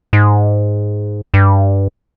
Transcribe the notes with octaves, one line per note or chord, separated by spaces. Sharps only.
G#2
G2